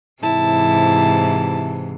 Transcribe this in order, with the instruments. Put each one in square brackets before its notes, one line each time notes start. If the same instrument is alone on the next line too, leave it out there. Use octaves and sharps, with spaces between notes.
[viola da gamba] G#2 C3 E3 [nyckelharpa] E4 A5